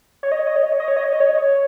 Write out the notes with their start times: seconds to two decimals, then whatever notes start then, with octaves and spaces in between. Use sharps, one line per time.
0.23 C#5
0.32 D#5
0.39 C#5
0.47 D#5
0.56 C#5
0.63 D#5
0.72 C#5
0.80 D#5
0.88 C#5
0.96 D#5
1.04 C#5
1.13 D#5
1.20 C#5
1.29 D#5
1.37 C#5